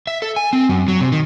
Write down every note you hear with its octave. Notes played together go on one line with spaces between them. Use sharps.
E5
A4
G#5
C4
F#2
F#3
C3
D#3